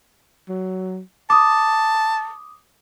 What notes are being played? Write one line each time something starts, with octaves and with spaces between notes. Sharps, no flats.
F#3
A5 D6 D#6